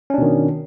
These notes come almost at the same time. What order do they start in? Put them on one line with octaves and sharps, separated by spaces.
C#4 D4 B2 D#3